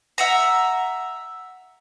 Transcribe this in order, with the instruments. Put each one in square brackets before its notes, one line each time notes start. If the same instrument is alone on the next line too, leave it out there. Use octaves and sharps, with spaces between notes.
[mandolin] E5 F#5 A#5